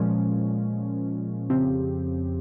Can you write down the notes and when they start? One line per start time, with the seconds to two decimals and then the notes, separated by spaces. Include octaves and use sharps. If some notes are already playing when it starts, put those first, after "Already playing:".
Already playing: A#2 F3 G#3 C#4
1.50 F2 C#3 F3 C4 G4